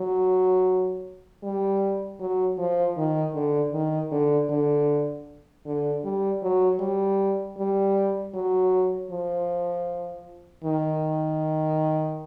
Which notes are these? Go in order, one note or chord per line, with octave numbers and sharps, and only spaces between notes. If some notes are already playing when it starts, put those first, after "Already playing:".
Already playing: F#3
G3
F#3
F3
D#3
D3
D#3
D3
D3
D3
G3
F#3
G3
G3
F#3
F3
D#3